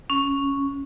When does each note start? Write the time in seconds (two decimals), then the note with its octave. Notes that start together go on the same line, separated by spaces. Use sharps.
0.10 C#4